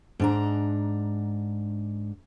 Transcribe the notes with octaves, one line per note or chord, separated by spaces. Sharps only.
G#2 D4 A#5